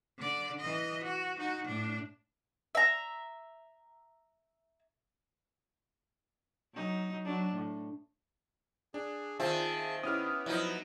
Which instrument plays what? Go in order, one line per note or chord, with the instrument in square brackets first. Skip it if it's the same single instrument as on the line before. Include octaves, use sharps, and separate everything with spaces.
[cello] D3 D5
E3 D#5
F#4
D#4 F#4
A2 D4
[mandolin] E5 A#5
[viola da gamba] F#3 D#4
F#3 D4
A2
[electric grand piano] D4 [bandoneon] G#4
[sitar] D#3 C4 [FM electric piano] F4 E5 [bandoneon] G#4 A5
[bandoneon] B3 [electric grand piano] C#4 E4 G4 [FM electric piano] D#6 F6
[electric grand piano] F3 E4 [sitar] F#3 D#4